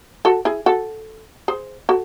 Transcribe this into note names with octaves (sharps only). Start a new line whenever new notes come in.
F#4 A4
E4 G#4
F#4 A4
G#4 C5
F#4 A4